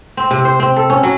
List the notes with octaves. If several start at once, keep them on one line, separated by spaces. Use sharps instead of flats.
C4
C3
C5
C4
A4
C#4
F#3